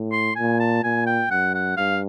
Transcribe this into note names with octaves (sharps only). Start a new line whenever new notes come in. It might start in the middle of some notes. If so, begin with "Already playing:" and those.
Already playing: A2
C6
A#2 G#5
A5
A#2 G#5
G5
F#2 F#5
F#5
G2 F5